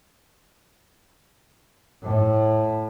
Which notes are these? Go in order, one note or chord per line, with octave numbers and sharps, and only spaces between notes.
A2